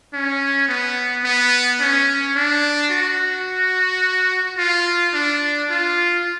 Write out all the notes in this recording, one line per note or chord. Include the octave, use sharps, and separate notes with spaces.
C#4
B3
B3
C#4
D4
F#4
F4
D4
F4